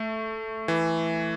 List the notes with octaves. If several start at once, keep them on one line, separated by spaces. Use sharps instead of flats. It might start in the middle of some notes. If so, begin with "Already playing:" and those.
Already playing: A3
E3